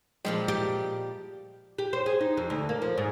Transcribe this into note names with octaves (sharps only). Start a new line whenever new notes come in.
A#2 F3 G3 G#3
G4
G4
C5
G#4
D#4
F2
D2
A#3
F3
G#2